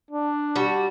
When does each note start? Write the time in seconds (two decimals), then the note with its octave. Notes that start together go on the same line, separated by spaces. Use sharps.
0.11 D4
0.56 G3 F#4